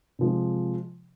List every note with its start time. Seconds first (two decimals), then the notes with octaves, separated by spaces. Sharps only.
0.19 C3 F3 G#3